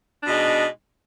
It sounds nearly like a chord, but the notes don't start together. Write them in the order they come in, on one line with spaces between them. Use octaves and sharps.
D4 B2 G#3 D#4